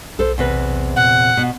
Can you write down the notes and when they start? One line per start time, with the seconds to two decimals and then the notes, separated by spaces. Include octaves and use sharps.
0.19 B1 A4 C5
0.38 E2 C3 B4
0.96 A#2 F#5
1.37 B2